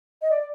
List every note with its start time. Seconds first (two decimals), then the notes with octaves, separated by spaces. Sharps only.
0.22 D#5
0.31 D5